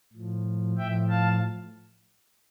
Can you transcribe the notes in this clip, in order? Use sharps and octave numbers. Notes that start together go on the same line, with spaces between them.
A2 F3
A2 F3 E5 G5
F5 A5